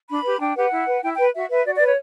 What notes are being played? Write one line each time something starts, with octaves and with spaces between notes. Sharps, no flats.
D4 B5
G4 B4
D4 G5
G4 B4 F#5
E4
B4
E4 G5
G5
B4
F#4 E5
B4 E5
F#4 D5
D5
B4
C#5